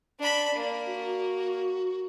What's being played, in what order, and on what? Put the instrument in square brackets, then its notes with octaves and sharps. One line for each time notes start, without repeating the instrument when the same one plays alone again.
[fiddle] D4 B5 [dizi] D5
[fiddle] A#3
[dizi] F#4